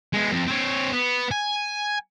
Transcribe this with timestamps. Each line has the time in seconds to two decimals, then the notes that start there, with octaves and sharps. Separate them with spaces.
0.13 G#3 B3
0.32 F2
0.47 C4 C#5
0.93 B3
1.31 G#5